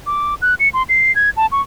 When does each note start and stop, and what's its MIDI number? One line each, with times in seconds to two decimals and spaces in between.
0.07 0.35 86
0.42 0.55 90
0.60 0.69 97
0.74 0.83 84
0.89 1.14 96
1.15 1.30 92
1.37 1.46 81
1.52 1.61 85